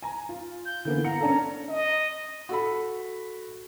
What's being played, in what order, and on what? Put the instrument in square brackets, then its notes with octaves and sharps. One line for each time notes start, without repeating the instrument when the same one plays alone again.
[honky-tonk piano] G#5 A#5
F4
[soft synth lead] G6
[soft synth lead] D3 [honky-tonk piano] E3 A#3 B3
[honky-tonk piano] F5 F#5 C#7 [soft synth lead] A#5
[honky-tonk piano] C#4 D4 A4
[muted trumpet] D#5
[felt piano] F#4 A4 B5